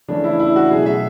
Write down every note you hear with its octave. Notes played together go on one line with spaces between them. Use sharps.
C#3 E3 A3 C#4 D4
E4
E4
F#4
B2 F#3 A3 G#4
E5